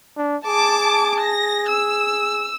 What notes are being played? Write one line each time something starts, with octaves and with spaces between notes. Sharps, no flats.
D4
G#4 A5 D6
A#6
E6